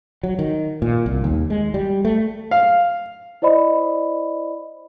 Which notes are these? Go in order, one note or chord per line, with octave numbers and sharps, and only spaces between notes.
F#3
D#3
A#2
C2
D#2
G#3
G3
A3
F5
E4 C5 D5 D#5 B5